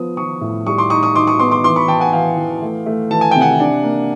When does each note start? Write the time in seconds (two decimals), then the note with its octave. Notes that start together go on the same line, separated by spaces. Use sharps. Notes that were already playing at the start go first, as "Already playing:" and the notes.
Already playing: F3 B3 D#6
0.17 F3 C#6 D#6
0.41 A2
0.67 G3 C#6 D#6
0.78 C6 D6
0.90 D#4 C#6 D#6
1.03 C#6 D#6
1.15 D#4 C6 D6
1.27 C#6 D#6
1.39 B3 C6 D6
1.51 C6 D6
1.64 E3 C6 D6
1.76 B5 C#6
1.88 E3 G5 A5
2.00 F#5 G#5
2.13 E3 F5 G5
2.37 E3
2.62 A3
2.86 A3
3.11 E3 A5
3.21 G#5
3.31 C3 G5
3.41 F#5 G#5
3.60 D4
3.84 A#3